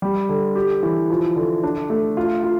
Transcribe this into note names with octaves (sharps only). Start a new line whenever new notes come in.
G3
D3
G4
E3
F3
D3
D4
A3
F4
F4